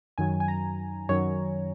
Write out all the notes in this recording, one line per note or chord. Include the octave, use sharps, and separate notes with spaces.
F#2 D#3 F#3 G#5
G#5
A#5
F#2 D#3 F#3 C#5